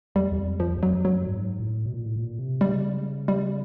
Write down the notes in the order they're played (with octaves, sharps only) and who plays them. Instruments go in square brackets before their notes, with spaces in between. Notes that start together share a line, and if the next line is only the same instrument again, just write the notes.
[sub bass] E2 [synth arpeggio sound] G3
[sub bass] E2
F2
[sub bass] F2 [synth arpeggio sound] F3
[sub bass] E2
[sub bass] F2 [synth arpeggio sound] F#3
[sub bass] F#2
[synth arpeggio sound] F#3
[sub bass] G#2
A2
B2
A#2
A2
A#2
C3
[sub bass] C#3 [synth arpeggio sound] G3
[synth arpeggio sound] G3